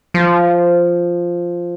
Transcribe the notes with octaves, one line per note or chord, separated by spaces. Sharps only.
F3